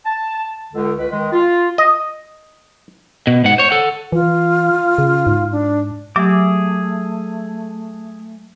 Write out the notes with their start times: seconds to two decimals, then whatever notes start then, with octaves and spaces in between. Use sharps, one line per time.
0.05 A5
0.74 C#2 D3
0.99 C#2 B4
1.11 D#3 G#3
1.32 F4
1.78 D#5
3.27 B2
3.44 G#2 F#5
3.58 C5 C#5
3.71 A4 F#5
4.12 E3 F4
4.98 C#3
5.27 G#2
5.52 D4
6.16 F#3 A3 G4 G#4 E5 D6